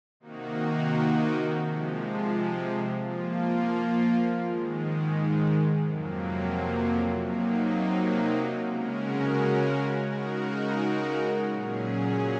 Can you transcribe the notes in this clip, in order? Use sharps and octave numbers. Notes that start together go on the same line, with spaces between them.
C3 D#3 A#3 D#4 F#4
C3 F3 G#3
F3 A#3 F4
G#2 D#3 G#3
F2 C3 F#3 A#3
C3 F#3 A#3 D#4
C#3 G#3 C#4 F#4 A#4
C#3 G#3 D#4 F#4 A#4
A#2 F#3 C#4 G#4